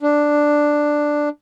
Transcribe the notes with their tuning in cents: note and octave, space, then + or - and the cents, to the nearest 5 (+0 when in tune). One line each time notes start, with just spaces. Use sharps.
D4 +5